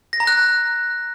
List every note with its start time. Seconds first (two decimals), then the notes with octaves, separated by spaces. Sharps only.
0.13 A#6
0.20 A#5
0.27 F#6